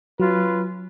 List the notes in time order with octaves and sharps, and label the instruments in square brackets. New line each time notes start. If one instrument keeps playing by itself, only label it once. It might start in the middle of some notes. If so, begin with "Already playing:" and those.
[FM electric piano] F#3 [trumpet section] C#4 F4 B4